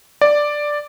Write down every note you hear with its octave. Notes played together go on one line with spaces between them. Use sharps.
D5